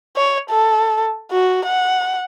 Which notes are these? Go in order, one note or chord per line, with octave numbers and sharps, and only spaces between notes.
C#5
A4
F#4
F#5